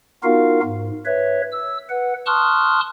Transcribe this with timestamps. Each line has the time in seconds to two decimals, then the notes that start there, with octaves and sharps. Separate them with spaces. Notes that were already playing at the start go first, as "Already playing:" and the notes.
0.24 B3 D#4 F4 F#4 A#4 F5
0.63 G#2
1.05 B4 C#5 E5
1.52 E6
1.89 B4 F#5
2.26 A5 C6 C#6 D#6 F6 F#6